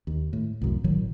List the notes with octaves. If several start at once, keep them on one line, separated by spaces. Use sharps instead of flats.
D#2
A2
C2 F#2 A2
G#1 A2 D#3 F#3